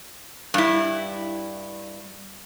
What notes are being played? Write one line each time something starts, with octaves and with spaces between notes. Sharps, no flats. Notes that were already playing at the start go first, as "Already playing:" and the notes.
G2 E4